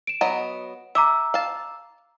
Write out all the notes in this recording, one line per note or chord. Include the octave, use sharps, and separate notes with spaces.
D7 E7
F#3 B3 D#5
E5 A#5 D6 E6
F5 A5